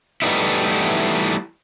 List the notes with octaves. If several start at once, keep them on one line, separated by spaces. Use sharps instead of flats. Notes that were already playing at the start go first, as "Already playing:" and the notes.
E3 G3 A3 B3 D#4 E4